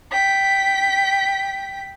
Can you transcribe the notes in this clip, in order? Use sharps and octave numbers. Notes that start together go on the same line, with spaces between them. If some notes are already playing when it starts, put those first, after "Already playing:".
G5 B6